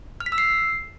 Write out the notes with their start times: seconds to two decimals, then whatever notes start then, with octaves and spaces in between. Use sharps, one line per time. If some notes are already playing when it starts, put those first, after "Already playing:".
0.20 F6
0.26 B6
0.32 E6
0.38 C7